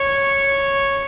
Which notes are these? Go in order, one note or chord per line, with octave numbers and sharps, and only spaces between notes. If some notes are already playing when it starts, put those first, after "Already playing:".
Already playing: C#5